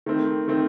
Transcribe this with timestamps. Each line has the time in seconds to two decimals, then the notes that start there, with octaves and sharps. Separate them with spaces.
0.06 D#3 A3 C4
0.48 D#3 A3 C4